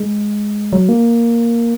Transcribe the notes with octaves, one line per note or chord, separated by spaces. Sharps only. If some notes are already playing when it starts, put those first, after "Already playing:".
Already playing: G#3
F#3
A#3